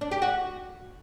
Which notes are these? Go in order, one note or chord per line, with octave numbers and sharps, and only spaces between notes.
D4
G4
F#4